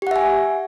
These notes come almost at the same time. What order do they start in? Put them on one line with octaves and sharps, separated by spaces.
G4 F#5 E5 G#5